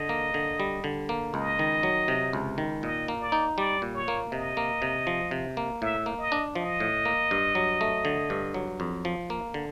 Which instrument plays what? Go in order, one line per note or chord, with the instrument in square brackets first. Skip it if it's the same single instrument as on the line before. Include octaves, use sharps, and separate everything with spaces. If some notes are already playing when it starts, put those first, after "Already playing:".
Already playing: [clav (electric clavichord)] D3 [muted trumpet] D#5
[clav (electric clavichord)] A#3
D3
G3
D3
A#3
[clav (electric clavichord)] C#2 [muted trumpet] D#5
[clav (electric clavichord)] D#3
F#3
C3
C#2
D#3
[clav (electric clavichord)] A#2 [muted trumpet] D#5
[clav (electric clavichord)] A#3
[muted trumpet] D5
[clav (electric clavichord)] D#4
[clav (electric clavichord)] G3 [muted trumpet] D5
[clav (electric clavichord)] A#2
[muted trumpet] C#5
[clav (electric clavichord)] A#3
[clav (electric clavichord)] C3 [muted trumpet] D#5
[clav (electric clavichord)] A#3
C3
F3
C3
A#3
[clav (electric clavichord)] A2 [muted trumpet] E5
[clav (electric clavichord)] A#3
[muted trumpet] D#5
[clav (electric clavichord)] D4
[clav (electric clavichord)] F3 [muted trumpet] D#5
[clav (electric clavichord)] A2
A#3
G2
F#3
A3
D3
G2
F#3
F2
F3
A#3
D3